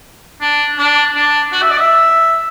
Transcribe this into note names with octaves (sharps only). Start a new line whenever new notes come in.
D4
D4
D4
F#4
E5
D5
E5